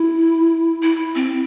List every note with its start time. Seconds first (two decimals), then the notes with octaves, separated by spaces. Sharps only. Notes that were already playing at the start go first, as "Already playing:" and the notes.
Already playing: E4
0.82 E4
1.15 C4